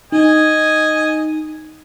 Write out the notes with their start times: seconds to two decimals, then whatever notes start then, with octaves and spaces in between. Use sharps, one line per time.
0.12 D#4 D#5 G#5